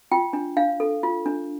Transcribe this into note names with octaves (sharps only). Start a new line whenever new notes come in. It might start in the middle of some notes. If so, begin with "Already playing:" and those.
F4 G5
D4
D4 F5
A4
F4
D4